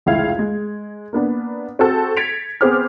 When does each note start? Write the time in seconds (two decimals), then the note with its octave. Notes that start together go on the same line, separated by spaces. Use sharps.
0.06 F1 C#2 E4 F5 G#6
0.39 G#3
1.13 A#3 B3 D4
1.79 C4 F#4 G#4 A4
2.17 G#6 A6 B6 C#7 D7 F7
2.61 B3 C4 G#4 C5 D6 F6